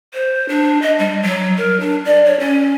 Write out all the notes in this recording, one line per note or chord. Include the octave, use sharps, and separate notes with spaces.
C5
D4
D#5
G3
F#3
A#4
D4
D5
C#5
C#4